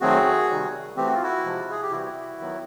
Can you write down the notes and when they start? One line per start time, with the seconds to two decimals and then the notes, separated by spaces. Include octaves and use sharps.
0.01 D#3 F#3 A3 C4 F#4 G#4
0.49 C3 D#3 G3
0.96 E3 A3 C4 G4
1.06 F#4
1.14 F4
1.23 E4 F#4
1.44 C3 F3 G#3
1.71 G#4
1.82 G4
1.92 C3 E3 G3 C4 E4 F#4
2.40 D#3 F#3 B3